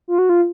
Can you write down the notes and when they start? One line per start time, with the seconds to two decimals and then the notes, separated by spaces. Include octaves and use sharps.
0.08 F4
0.18 F#4
0.29 F4